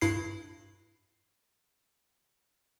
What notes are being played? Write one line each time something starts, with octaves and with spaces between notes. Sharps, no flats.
G2 E4 C7